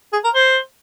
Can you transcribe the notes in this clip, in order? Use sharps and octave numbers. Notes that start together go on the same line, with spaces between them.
G#4
A#4
C5